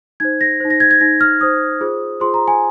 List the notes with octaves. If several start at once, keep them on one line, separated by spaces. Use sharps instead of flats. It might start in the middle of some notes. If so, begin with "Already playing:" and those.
D#4 C5 G#6
A#6
D#4 C5
A#6
G#6
G#6
D#4 C5 A#6
F6
D#4 C5 D#6
F4 G#4 C5
F4 G#4 C5 C6
A#5
G#5